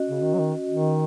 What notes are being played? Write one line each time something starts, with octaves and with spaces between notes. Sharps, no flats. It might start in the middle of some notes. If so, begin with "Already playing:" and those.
Already playing: C#4 F#4 D#5
C#3
D#3
F#3
D#3
D#3